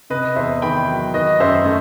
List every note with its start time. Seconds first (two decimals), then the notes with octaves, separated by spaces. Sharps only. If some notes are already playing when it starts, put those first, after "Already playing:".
0.10 C3 B4 D#5
0.36 E2 C5 E5
0.62 D#3 G5 B5
0.88 F#3
1.14 D#3 B4 D#5
1.40 F#2 C5 E5
1.65 A3